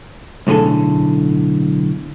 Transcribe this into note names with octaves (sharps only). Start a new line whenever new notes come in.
B1 A2 D3 G#4 A4